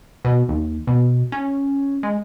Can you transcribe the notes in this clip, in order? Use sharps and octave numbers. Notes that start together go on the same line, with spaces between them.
B2
D#2
B2
C#4
G#3